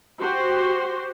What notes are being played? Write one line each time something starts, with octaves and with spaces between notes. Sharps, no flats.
F#4 G4 C5